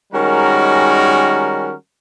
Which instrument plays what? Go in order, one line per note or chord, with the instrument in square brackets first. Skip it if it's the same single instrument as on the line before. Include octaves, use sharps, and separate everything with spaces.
[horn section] D#3 G3 G#3 C#4 F#4 A#4